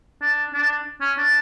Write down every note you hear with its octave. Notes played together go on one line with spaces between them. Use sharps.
D4
D4
C#4
D4